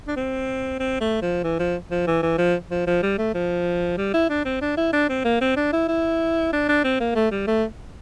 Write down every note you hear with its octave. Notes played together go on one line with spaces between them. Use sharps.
D4
C4
C4
A3
F3
E3
F3
F3
E3
E3
F3
F3
F3
G3
A3
F3
G3
E4
D4
C4
D4
E4
D4
C4
A#3
C4
D4
E4
E4
D4
D4
C4
A#3
A3
G3
A3